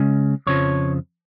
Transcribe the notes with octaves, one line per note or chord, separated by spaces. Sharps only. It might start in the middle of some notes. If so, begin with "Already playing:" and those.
Already playing: C#3 G#3 C#4
F2 C#3 F3 C#5